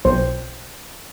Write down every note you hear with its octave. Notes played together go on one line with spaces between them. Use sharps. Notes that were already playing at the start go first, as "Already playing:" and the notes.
B1 C5